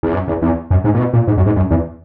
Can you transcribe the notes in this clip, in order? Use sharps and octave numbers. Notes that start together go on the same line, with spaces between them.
E2
F#2
E2
E2
F#2
G#2
A#2
B2
A#2
G#2
F#2
G#2
F#2
E2